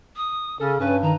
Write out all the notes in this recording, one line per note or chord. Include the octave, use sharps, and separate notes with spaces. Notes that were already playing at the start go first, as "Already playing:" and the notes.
D#6
C#3 C#4 A4
G2 C#4 B4
D#3 A#5